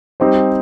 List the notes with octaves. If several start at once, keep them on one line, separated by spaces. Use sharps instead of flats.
G3 C4 D#4 G4 C5